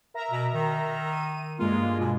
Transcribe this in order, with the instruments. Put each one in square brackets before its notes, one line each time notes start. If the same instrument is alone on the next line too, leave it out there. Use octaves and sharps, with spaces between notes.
[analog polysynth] A#4 E5 A#5
[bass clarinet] B2
D#3
[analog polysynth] D#7
[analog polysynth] G2 G#3 A#3 [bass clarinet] F4
[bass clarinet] B2